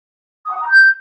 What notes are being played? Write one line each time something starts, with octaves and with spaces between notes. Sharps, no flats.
D#6
F#5
D#6
A#5
G6